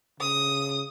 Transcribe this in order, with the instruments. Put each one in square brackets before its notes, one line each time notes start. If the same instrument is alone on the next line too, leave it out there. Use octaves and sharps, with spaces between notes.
[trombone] C#3 [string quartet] D#6